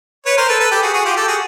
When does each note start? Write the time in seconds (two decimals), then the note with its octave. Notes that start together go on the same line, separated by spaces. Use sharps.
0.26 B4 C#5
0.37 A#4 C5
0.48 A4 B4
0.60 A4 B4
0.71 G4 A4
0.82 F#4 G#4
0.94 F#4 G#4
1.05 F4 G4
1.16 G4 A4
1.28 F#4 G#4